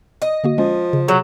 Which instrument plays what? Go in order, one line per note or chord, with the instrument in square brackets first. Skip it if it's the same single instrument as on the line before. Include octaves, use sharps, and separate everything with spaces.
[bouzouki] D#5
[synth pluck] D3 A#3 F#4
[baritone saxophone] F3 [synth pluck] G#3 C#4
[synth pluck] C#3
[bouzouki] C3 [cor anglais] F#3 [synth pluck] G#4 C#5 E7